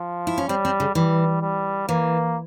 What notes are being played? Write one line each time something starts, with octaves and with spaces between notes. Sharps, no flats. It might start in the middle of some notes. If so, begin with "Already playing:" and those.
Already playing: F3
E4
C#4
G3 C4
C4
C#3
E3 G3
G3
E3 A#3